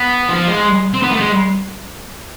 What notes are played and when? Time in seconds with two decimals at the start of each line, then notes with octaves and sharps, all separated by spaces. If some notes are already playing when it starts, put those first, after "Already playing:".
Already playing: B3
0.29 F3
0.47 G#3
0.94 C4
1.02 B3
1.11 A3
1.20 G#3